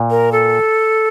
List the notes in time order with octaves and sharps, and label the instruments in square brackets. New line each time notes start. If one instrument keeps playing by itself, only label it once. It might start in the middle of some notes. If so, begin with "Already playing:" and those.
Already playing: [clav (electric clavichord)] A#2
[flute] A#4
A4